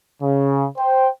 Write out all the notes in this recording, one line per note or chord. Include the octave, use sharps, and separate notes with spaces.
C#3
C5 G5